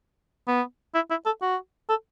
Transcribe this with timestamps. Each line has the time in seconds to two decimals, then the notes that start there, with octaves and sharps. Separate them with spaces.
0.48 B3
0.95 E4
1.11 E4
1.26 A4
1.42 F#4
1.90 A4